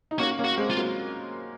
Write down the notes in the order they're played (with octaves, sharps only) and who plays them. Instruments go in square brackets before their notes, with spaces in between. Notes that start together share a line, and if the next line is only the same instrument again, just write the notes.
[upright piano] D#4
[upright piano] A#3 C#4 [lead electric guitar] F#4
[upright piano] A#3 C#4
[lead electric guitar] F#4
[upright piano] G#3 C4
[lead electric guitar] F4
[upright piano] F#3 A#3